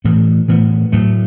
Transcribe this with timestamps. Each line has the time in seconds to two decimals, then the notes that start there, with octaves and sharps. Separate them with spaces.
0.05 A2 E3 B3
0.48 A2 E3 B3
0.92 A2 F#3 A3